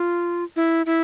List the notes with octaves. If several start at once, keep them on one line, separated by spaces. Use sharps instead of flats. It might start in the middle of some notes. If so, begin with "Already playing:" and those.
Already playing: F4
E4
E4